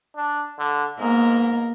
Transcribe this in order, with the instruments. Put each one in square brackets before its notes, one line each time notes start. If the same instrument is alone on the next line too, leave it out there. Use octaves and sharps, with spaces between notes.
[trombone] D4
D3
[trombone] G#2 [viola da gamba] A#3 B3 A#4